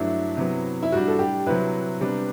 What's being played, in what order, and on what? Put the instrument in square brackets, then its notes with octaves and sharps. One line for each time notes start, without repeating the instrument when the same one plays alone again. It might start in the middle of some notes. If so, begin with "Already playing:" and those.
Already playing: [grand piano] G2 F#3 A3 D4 [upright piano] E4
[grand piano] C3 F#3 B3
[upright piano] E4
[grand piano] A2 G3 D4 [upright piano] F#4
[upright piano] A4
G4
[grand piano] C3 F#3 C4 E4 [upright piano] B4
[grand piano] C3 G3 B3 D4